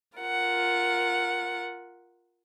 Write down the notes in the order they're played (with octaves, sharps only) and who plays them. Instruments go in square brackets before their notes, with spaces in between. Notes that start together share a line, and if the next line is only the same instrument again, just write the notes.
[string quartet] F4 A#4 F#5